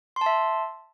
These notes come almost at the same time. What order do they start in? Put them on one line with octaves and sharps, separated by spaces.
C6 A5 E5